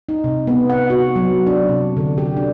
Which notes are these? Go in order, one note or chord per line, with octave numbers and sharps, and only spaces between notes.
D#4
C3
B3
F#5
F#4
F#3
D4
C3
D3
G4
D4